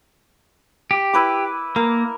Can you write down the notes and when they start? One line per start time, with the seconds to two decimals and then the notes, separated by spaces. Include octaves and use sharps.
0.91 G4
1.13 E4 B4 D6
1.76 A#3 A#4